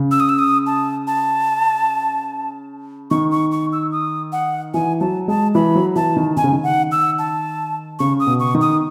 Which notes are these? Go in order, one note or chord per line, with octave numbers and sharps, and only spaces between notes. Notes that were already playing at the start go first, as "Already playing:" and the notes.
Already playing: C#3
E6
D#6
E6
D#6
A5
A5
D#3 C#6
C#6
C#6
E6
D#6
F#5
E3 G#5
F#3 A5
G#3 A5
E3 B5
F#3
E3 A5
D#3
D#3 G#5
C#3
D#3
F#5
E6
A5
C#3 C#6
D#6
B2
C#6
D#3
D#6